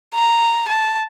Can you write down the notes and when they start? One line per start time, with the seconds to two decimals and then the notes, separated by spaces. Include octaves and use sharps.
0.14 A#5
0.69 A5